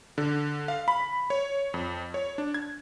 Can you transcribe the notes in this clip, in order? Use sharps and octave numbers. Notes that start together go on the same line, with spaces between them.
D3
F5
B5
C#5
F2
C#5
D4
G#6